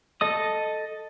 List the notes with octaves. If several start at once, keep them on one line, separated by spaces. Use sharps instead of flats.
A4 D#5 D#6